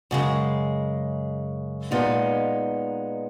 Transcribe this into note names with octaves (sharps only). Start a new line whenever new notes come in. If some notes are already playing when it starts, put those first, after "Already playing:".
F#2 C#3 G#3
A#2 G#3 B3 D#4